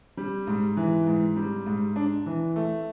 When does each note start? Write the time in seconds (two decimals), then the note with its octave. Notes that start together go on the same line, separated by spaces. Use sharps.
0.17 G3
0.47 G#2
0.77 E3
1.07 G#2
1.36 G3
1.66 G#2
1.96 D4
2.26 E3
2.56 A3